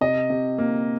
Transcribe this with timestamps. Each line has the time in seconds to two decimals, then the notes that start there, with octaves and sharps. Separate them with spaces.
0.01 C3 D#5
0.30 C3
0.58 A#3